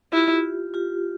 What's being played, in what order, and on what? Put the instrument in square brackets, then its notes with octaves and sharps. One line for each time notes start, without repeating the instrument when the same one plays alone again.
[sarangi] E4 [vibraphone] F4 G4
[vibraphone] F4 G4